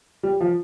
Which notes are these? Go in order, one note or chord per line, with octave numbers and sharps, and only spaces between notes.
G3
F3